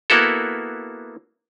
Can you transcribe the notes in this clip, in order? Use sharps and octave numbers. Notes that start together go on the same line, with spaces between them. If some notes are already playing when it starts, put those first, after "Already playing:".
A#3 B3 E4 F#4 A4